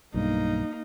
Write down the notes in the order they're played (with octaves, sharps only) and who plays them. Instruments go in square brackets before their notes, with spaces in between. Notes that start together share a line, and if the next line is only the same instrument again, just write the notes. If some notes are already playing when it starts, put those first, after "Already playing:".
[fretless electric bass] B1 G2 [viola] A#3 D#4